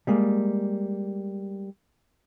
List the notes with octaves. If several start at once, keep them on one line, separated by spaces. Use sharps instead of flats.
G3 G#3 A#3